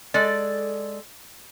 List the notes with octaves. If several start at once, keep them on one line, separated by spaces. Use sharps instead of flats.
G#3 A4 D5